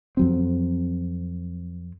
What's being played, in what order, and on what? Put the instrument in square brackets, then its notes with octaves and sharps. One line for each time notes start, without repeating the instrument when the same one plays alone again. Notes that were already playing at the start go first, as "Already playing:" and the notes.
[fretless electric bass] F2 F#3 C4